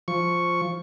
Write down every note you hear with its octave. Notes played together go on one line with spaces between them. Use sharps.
F3 C#6